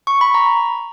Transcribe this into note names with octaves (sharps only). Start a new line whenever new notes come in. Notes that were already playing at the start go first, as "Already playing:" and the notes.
C#6
B5
A#5